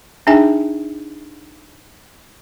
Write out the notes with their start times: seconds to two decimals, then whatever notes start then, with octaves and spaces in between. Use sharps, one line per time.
0.27 D4 D#4 G#4 E5 G5 G#5